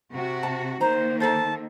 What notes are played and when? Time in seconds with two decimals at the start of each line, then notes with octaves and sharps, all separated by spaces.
0.14 C3 F#4
0.43 A5
0.81 D#3 A#3 C5 A#5
1.20 D#4 A4 C5 A5